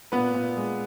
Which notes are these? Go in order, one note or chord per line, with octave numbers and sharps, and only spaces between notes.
A#2 B3 B4
A#2
G#3